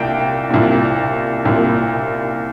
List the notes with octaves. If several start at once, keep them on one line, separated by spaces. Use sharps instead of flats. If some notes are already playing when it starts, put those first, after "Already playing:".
Already playing: C2 A#2 G5
C2 A#2
C2 A#2